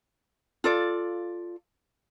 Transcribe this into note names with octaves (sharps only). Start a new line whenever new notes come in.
F4 A4 D5